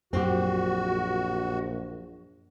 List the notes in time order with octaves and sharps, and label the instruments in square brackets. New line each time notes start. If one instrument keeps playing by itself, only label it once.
[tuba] A#1 [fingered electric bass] F#2 [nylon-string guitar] C4 G4 [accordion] F#4